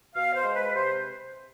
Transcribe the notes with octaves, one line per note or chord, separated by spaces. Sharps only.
B2 F5
C5
G#3
B4
C3 C5